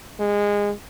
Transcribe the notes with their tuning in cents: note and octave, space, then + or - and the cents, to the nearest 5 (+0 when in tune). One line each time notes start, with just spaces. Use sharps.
G#3 -20